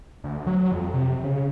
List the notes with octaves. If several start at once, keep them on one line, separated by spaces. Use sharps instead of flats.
D2
F#3
F2
C3
C#3